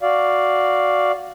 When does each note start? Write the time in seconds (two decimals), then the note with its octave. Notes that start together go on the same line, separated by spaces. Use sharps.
0.02 F#4 D5 F5